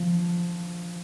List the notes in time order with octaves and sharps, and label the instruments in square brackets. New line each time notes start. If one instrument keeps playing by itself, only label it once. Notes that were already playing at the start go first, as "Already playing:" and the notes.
Already playing: [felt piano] F3